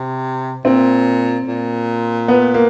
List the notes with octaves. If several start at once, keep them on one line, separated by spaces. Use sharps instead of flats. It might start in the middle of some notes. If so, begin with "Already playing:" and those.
Already playing: C3
A#2 C4
A#2
B3
A#3